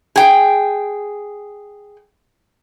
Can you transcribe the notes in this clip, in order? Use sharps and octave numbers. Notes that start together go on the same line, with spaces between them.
G#4 G5